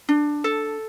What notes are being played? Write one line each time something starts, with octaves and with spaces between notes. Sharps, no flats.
D4
A4